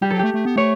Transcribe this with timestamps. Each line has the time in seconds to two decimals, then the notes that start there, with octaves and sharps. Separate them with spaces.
0.01 G3 G4
0.10 F#3 A4
0.19 A3 G4
0.34 A3
0.45 B3
0.56 A3 C#5